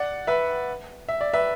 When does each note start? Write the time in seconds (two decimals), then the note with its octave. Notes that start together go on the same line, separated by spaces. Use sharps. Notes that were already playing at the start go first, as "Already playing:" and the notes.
Already playing: D5 F#5
0.27 B4 E5
1.09 E5
1.21 D5
1.33 B4 E5